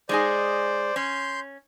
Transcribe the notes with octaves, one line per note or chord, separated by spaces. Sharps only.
G#3 D#4 G#4 C5 D5
C#4 C6 G6